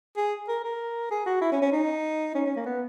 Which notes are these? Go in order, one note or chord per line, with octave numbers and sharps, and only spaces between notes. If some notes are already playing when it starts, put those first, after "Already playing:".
G#4
A#4
A#4
G#4
F#4
E4
C#4
C#4
D#4
C#4
C#4
A#3
B3